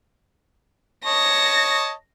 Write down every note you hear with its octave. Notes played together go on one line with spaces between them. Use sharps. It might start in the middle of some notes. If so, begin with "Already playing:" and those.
C#5 D#5 A5 A#6